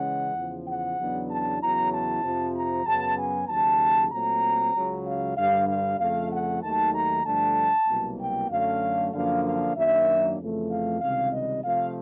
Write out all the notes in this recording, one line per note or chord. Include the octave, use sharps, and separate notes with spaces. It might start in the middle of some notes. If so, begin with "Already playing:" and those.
Already playing: C#3 E3 G#3 C#4 F#5
E2 C#3 F3
F#5
E2 C#3 F#3 B3 D4
A5
E2 C#3 F#3 B3 E4 A#5
A5
F2 C3 F3
A#5
F#2 C#3 F#3 B3 A5
G#5
D#2 C#3 F#3 A5
A#2 F#3 A3 C4 A#5
C#2 C#3 F#3
F5
G2 D3 G3 F5
F5
F2 C#3 F3 A3 F5
F#5
D#2 D#3 F#3 A3 A5
A#5
G2 D3 F3 A3 D4 A5
C2 B2 F#3 A#3
G5
F#2 D3 F#3 A3 C#4 F5
F#2 D3 F3 A#3 D4 F5
F5
F#2 D#3 F#3 A#3 D4 E5
F2 C#3 E3 A3
F5
C#2 C3 D#3 G3 F5
D#5
C3 F3 A3 F5